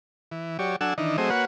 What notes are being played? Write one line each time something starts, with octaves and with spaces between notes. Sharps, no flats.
E3
F#3 G4 C#5 D5
F#3 D4 A4 F#5 G#5 E6
D#3 E3 D4 D#4
F#3 A3 C4 G#4 C5 D#5
A#3 F#4 B4 C#5 F#5